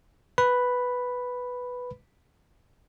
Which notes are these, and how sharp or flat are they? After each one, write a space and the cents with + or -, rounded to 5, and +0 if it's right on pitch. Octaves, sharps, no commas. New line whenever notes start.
B4 +0 B5 +0